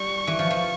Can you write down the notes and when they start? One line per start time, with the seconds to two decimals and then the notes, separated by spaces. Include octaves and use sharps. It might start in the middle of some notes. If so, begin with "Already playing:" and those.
Already playing: G3 C#6
0.27 E3
0.39 F3
0.51 F3